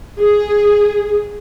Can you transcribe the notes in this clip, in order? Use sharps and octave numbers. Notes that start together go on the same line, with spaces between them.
G#4